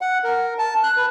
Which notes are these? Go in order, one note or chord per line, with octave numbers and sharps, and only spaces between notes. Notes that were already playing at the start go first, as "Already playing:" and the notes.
F#5
A#4
A5
F#6
B4